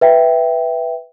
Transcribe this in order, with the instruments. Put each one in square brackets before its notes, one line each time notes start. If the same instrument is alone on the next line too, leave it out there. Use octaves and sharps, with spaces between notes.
[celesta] B4 E5 G5